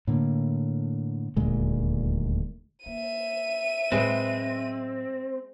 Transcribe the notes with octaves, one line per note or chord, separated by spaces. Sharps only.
A2 D3 A#3
D#1 D2 A#2 G#3
A#3 E5 D#7
A2 F#3 G#3 C4 B4